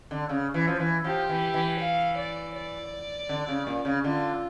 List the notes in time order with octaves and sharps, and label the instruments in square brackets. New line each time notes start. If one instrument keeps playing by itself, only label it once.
[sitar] D3
C#3
E3
F3
E3
[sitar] F3 [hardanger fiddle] G4
[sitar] E3
E3
[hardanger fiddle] F5
D5
D5
[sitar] D3
C#3
A#2
C#3
[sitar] D3 [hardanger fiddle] F4